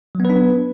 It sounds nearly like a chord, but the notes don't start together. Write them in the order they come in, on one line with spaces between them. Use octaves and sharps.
F#3 B3 B4 D4